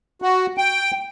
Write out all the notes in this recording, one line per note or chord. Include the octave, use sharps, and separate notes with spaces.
F#4
G5